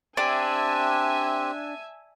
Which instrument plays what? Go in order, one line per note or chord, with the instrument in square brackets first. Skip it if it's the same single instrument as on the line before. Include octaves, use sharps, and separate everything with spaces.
[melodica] C4 G4 [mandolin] D4 [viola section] E5 G#5